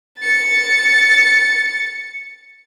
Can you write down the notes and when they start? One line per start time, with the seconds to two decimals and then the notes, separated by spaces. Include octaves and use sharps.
0.20 A6 C#7